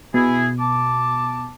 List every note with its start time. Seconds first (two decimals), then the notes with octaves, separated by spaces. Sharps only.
0.14 B2 E4 G#4
0.59 A5 D6